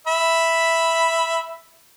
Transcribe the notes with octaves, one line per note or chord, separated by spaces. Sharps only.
E5 B5